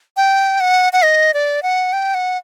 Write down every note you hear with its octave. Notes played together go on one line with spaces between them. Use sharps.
G5
F#5
F#5
D#5
D5
F#5
G5
F#5